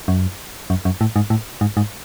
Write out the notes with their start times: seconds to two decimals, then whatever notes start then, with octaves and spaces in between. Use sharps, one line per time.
0.08 F#2
0.70 F#2
0.85 F#2
1.01 A2
1.16 G#2
1.30 A2
1.61 G#2
1.77 G#2